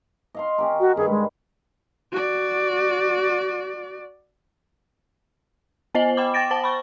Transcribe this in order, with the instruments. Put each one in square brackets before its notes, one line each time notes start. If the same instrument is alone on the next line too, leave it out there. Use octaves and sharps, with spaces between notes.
[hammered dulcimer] D#5 F5 C6
C#4 G4 A#4
[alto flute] F#4
[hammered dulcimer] G2 D#3 B4 [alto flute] G#4
[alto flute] G#3
[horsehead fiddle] F#4 D5
[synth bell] B3 C5 D#5 G#5 F#7 G7
G5 B5 D6
G5 D6 A6 A#6 D7
C5 A5 G7
B5 C#6